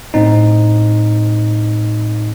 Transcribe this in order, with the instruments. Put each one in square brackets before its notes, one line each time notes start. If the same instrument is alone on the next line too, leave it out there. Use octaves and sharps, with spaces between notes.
[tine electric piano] A2 C4 D#4